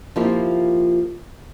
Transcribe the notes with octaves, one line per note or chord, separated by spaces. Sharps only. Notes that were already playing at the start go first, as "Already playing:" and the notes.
F3 A#3 E4 F4 G4